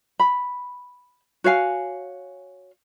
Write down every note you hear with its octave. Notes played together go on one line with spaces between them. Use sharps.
B5
F#4 C#5 F5 G#5